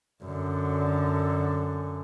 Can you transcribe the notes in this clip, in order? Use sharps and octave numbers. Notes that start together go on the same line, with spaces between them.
F#2 D3